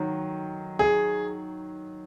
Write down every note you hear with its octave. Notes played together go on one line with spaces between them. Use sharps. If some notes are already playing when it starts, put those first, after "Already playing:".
Already playing: D#3 F#3
G#4